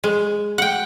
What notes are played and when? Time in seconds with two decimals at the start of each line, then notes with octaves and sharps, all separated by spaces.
0.04 G#3
0.58 F#5 G5